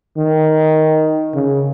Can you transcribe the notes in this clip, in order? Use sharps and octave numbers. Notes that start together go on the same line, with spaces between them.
D#3
C#3